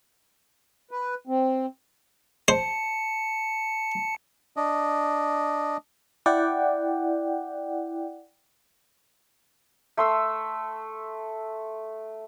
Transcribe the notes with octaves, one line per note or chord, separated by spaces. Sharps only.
B4
C4
C5 A5 C#7
D4 D#5
E4 D5 F#5 G5
A3 C6 E6